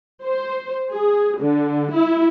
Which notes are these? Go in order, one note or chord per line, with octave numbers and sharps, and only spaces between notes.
C5
G#4
D3
E4